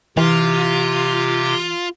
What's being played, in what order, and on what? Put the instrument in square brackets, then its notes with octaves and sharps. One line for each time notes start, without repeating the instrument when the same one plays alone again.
[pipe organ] C3 G4 [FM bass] E3 [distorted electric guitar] F4